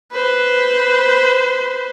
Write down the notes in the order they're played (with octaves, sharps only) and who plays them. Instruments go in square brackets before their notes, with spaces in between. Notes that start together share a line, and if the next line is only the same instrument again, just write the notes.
[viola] B4 C5